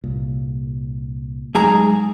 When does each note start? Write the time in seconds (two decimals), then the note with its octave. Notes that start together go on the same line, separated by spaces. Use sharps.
0.04 C2 A#2
1.55 G#2 F#3 G#3 G#4 A#5